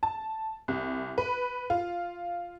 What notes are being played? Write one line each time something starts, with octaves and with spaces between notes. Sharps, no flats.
A5
C2
B4
F4